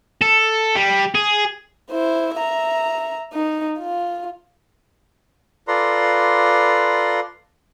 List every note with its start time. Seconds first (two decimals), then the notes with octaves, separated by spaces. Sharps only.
0.21 A4
0.76 G3
1.15 G#4
1.91 E4 C5
2.35 E5 A#5
3.33 D#4
3.79 F4
5.68 F4 A4 B4 D5 A#5 C6